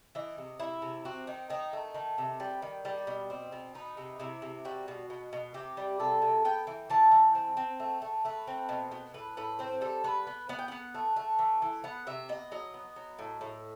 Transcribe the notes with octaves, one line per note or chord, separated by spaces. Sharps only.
E3 D#5
C3
C3 E4
C3
C4 F#4
D#3 D#4
D#3 D#4
A3
D#3
C3
G3
D#3
G3
B2
C4
B2
B3 D#4
C3
C3 E4
C3
G3 F#4
B2
B2
B2
C3 G4
G3
C3 A4
C3
B3 G5
E3
E3 A5
E3
C4
C4
A3
A3
A3 B4
C4
B2
B2
A2 B4
A2 B4
C4 C5
G3 A4
B3 B4
B3
B3 F#5
G5
B3 F#5
A3
A3
E3
E3
B3 F#5
C3 E5
B3 D#5
F#3 D#5
B3
F#3
A2
A2